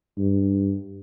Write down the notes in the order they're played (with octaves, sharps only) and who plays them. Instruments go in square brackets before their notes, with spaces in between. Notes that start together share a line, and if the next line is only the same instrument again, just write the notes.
[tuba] G2